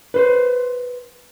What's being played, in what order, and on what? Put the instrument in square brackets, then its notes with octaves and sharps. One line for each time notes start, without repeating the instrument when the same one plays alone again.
[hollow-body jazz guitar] B4 C5